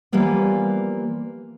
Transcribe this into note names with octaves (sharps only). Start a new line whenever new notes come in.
E3 F3 G3 A#3 B3